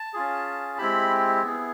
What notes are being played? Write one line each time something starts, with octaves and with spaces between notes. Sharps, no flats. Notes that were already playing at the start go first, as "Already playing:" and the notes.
Already playing: A5
C#4 F4 G#4
G#3 C4 E4 G4 B5
B3 E4 G#4